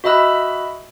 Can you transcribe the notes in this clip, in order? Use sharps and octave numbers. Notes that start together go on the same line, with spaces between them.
F#4 D#5 E5 B5 E6 F#6